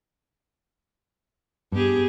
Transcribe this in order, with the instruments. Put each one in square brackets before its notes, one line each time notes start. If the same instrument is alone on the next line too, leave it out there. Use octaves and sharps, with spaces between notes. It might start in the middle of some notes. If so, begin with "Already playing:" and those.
[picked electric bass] G2 [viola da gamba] B3 G4 G#4